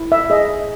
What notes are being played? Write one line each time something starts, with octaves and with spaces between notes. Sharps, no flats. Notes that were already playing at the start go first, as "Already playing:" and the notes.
Already playing: E4
E5
G#4 D#5